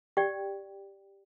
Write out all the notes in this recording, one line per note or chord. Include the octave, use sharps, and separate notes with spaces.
G4 D5 G5